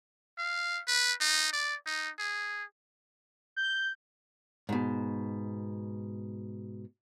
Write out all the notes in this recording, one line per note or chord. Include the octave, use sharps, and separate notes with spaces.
F5
B4
D#4
D5
D#4
G#4
G6
G#2 B2